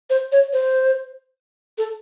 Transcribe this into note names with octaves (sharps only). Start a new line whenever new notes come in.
C5
C#5
C5
A4